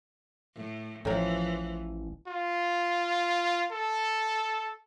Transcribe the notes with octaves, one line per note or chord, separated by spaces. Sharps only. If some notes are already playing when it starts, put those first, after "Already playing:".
A2
A1 A2 E3 F3 A#4
F4
A4